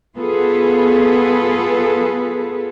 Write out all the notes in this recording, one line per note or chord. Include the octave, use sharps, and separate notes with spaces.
B3 F4 G#4 A4 B4